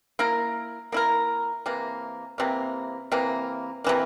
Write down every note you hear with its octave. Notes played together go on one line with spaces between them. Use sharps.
A#3 E4 A#4
A#3 E4 A#4
C3 E3 A#3
C3 E3 A#3
C3 E3 A#3
C3 E3 A#3